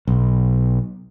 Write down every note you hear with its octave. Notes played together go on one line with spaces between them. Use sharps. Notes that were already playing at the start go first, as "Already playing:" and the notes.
B1